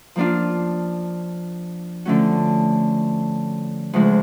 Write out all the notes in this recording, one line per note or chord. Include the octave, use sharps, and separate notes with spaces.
F3 A#3 D4 F4
D3 F3 A3 C#4 F#4
D2 C#3 F3 G#3